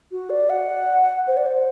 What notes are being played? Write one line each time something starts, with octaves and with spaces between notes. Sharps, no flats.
F#4
D5
F#5
C5
D5
C5